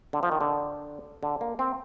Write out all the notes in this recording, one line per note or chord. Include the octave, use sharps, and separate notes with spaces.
D3
F3
D#3
D3
D3
A#3
C4